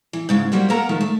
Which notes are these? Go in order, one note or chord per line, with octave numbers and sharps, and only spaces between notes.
E3
G#2 C#3 G#3
F#3 G3 A#3 G4 C5
A#3 A4 A#4 F#5 A#5
D#3 F3 A3
A3